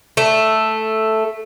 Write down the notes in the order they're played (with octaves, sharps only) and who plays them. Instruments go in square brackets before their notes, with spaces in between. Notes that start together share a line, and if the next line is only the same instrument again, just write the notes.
[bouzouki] A3